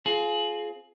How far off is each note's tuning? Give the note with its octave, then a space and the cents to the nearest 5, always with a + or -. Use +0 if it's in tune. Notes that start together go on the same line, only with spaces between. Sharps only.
C4 +0 F4 +0 G#4 +30